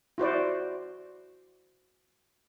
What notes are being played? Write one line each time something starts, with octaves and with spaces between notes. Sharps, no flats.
E4 F#4 C5 D5